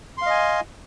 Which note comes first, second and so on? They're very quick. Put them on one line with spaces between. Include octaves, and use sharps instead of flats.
C6 F5 D#5 G#5